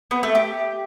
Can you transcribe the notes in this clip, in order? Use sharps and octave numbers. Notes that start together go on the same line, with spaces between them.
B3
A3
G4